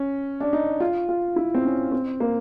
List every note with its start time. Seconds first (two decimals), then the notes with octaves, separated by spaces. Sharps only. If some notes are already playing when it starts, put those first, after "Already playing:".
Already playing: C#4
0.40 D4
0.53 D#4
0.80 F4
1.09 F4
1.36 E4
1.55 C4
1.65 C#4
1.92 C4
2.20 A#3